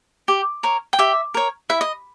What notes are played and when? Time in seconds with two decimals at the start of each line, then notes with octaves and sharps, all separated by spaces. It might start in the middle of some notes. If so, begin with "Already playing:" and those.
0.28 G4
0.63 A#4 C#5
0.93 G5
0.99 G4 E5
1.34 A#4 C#5
1.69 E4 E5
1.81 D#5